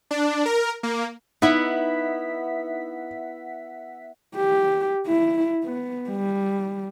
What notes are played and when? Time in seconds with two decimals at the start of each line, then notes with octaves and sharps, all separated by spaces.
0.11 D4
0.45 A#4
0.83 A#3
1.42 B3 D#4 E4 E5 F#5 B6
4.36 G4
5.07 E4
5.63 B3
6.10 G3